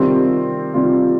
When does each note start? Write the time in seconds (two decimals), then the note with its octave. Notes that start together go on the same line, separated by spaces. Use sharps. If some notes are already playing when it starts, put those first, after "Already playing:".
Already playing: C3 D#3 G3 C4 F4
0.74 C3 D#3 G3 C4 F4